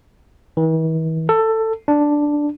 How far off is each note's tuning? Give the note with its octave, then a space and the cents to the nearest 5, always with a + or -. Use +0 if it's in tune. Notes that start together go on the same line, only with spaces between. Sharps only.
E3 -45
A4 +15
D4 +0